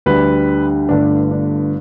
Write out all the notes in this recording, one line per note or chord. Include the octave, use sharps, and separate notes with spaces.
D2 D3 G3 B4
G1 G2 D3 A3 D4
D4